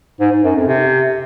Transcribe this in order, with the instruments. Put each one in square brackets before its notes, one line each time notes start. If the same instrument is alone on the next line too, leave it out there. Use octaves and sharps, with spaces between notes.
[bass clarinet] G#2
G#2
F#2
F2
C3